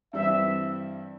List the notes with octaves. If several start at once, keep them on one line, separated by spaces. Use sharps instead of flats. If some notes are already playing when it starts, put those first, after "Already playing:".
G2 E3 G3 C4 E4 E5